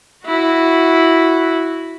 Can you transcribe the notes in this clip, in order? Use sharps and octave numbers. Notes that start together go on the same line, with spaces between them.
E4 F#4